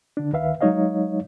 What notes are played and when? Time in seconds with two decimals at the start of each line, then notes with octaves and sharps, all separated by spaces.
0.17 D3 D4
0.33 D2 D#3 B4 E5 F5
0.61 F#3 G#3 D#4 C#5 D#5 F5